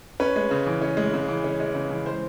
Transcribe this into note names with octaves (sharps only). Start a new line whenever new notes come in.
C#4 B4
G#3
C#3
E3
C#4
G#3
C#3
E3
C#4
G#3
C#3
E3
C5